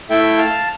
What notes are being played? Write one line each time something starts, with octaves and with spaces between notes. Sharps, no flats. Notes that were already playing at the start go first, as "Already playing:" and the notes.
A3 E4 A4 E5 G5
F5 A5